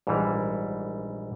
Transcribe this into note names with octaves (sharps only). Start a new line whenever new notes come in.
A#1 G#2 E3 G3